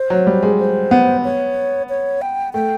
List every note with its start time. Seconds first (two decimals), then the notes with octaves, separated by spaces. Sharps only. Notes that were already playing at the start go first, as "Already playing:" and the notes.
Already playing: C5
0.10 F#3
0.27 G3
0.43 G#3
0.59 C5
0.91 B3
1.24 C#5
1.89 C#5
2.22 G5
2.53 A3 G5